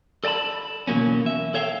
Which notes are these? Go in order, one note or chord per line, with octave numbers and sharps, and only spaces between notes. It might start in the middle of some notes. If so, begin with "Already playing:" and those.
A4 D5 G5 A5 B5
E2 B2 F#3 A#3 C#4
E5
A4 C#5 E5 F5 G5